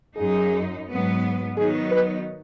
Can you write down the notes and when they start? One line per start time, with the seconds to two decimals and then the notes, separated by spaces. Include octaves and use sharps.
0.17 F#2 F#3 D#4 G#4
0.87 G#2 F#3 B3
1.57 D#3 F#3 B3 D#4 G#4
1.92 B4